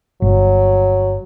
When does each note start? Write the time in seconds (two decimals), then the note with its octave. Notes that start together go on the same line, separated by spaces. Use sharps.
0.22 G1 F#3